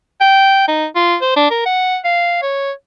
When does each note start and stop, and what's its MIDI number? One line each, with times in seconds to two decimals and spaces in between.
0.21 0.64 79
0.68 0.86 63
0.96 1.16 65
1.22 1.32 72
1.36 1.48 62
1.51 1.63 70
1.66 1.98 78
2.05 2.40 77
2.42 2.71 73